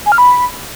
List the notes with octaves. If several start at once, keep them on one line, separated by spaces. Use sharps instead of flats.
G#5
F6
B5